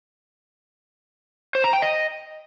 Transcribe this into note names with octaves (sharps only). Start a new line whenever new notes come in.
C5
A#5
G5
D#5